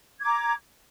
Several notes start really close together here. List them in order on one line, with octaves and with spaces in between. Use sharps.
G#6 D6 A#5